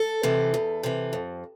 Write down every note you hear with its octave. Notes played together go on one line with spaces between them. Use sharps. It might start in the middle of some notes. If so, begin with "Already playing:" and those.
Already playing: A4
C3 E3
E2
C3 E3
F2